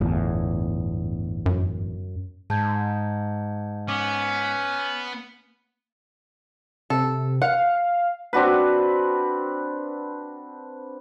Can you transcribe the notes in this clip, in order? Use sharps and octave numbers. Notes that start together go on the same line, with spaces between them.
G1 E2 A2
F#2
G#2 A5 G6 G#6
B3 C#4 D6
C3 A4
F5 F#5
C4 D4 F#4 B4